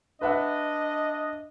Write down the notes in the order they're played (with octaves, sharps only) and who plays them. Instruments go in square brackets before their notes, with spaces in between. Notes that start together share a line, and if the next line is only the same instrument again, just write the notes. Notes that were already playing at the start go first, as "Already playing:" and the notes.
[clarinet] D4 [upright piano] B4 E5 F#5 [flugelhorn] D#5